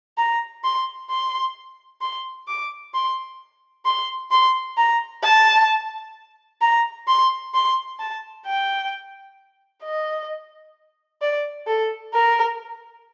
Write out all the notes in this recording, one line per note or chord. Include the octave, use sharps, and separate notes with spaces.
A#5
C6
C6
C6
D6
C6
C6
C6
A#5
A5
A#5
C6
C6
A5
G5
D#5
D5
A4
A#4